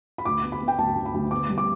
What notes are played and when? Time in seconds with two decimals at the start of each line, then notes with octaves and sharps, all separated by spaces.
0.18 B5
0.25 D2 D6
0.43 B3
0.52 B5
0.61 B3
0.68 G5
0.78 D2 A5
0.96 D2
1.05 B5
1.14 D2
1.31 B3 D6
1.50 G3
1.58 D6